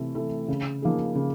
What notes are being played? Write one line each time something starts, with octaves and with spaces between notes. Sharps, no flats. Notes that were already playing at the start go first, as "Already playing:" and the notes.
Already playing: C3 E3 A3
E3 A3
C#3
F3 A#3 D#4 G#4
C#3